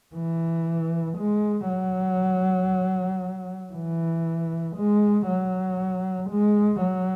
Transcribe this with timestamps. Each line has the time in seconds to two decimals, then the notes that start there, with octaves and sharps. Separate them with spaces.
0.15 E3
1.18 G#3
1.69 F#3
3.73 E3
4.76 G#3
5.27 F#3
6.30 G#3
6.81 F#3